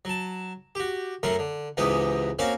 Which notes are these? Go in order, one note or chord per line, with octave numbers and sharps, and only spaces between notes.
F#3 A5
F#4 G4
F#2 F#3 A3 A#4 F#5 C6
D3
C#2 G#2 E3 B3 G4 D#5
A#3 C4 C#4 F#4 C#5 F5